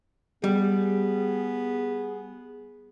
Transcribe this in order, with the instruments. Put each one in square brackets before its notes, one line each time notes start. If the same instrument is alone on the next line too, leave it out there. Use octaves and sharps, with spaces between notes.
[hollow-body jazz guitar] G3 [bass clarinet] B3 [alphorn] G#4